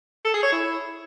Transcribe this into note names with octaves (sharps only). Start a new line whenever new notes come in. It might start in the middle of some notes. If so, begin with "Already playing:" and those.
A4
G#4
C#5
E4